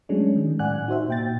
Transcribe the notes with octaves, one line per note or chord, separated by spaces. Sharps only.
F#3 G#3 A3 C#4 D4
D#3
A2 D5 F#5 G#5 F#6
D#4 F#4 C5 E5
A#2 G5 A6